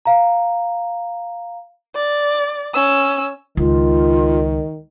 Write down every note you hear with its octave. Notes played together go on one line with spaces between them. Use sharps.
F5 A#5
D5
C#4 E6
C#2 D#3 F4